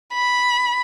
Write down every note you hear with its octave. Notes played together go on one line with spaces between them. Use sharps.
B5